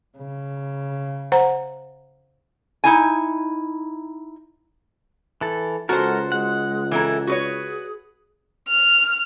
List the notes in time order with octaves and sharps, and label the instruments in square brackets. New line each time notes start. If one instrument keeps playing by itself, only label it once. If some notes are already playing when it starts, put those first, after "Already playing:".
[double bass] C#3
[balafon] C5 F#5 A#5
[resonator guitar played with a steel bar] D#4 E4 G#5
[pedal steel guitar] E3 A4
[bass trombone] C#2 [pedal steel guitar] G#3 A4 A#4 [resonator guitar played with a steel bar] F#4 C5
[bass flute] G#3 [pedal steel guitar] F#5
[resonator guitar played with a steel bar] E3 E4 A#5 [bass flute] A4
[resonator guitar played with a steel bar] F#4 B4 C#5 [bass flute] G#4
[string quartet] F6